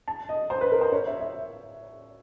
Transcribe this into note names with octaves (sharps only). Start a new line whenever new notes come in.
A5
D#5
C5
B4
A#4
C5
C#5
E5
E5